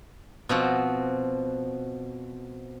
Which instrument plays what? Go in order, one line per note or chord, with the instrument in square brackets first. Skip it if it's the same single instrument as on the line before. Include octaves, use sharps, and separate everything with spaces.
[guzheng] B2 F3 C4 F#4